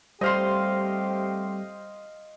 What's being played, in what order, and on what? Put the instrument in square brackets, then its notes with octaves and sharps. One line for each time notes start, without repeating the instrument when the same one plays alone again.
[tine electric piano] G3 [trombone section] A3 C4 G4 [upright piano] C5 [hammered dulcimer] D#5 F5 C6